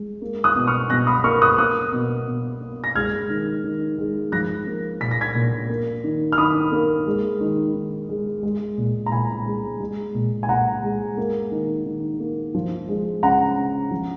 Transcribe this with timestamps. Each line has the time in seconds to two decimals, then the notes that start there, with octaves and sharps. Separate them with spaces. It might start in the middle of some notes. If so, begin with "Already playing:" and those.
Already playing: G#3
0.22 A#3
0.44 D#6 F#6
0.56 B2
0.67 C#6 F6
0.90 B2 F#6 A#6
1.07 B5 D#6
1.24 A#3 C#6 F6
1.42 D#6 F#6
1.58 A#3 D#6 F#6
1.92 B2
2.27 B2
2.61 A#3
2.84 A#6
2.95 G#3 F6 G#6
3.30 D#3
3.64 D#3
3.98 G#3
4.32 F3 F#6 A#6
4.67 A#3
5.01 A#2 B6
5.11 A#6
5.21 G#6 B6
5.35 A#2
5.69 A#3
6.04 D#3
6.32 F6
6.38 D#3 B5 D#6
6.72 A#3
7.07 G#3
7.41 D#3
7.75 D#3
8.09 G#3
8.43 G#3
8.78 A#2
9.06 A#5
9.12 A#2 G#5 B5
9.46 G#3
9.80 G#3
10.15 A#2
10.43 G#5
10.49 A#2 F#5 A#5
10.83 G#3
11.17 A#3
11.52 D#3
11.86 D#3
12.20 A#3
12.55 F3
12.88 G#3
13.23 C#3 F#5 A#5
13.57 C#3
13.91 F3